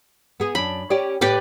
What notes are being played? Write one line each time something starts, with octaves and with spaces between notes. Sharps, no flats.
B3 G#4
F#2 D4 B5
C#4 G4 D5
A2 G4 B4 D5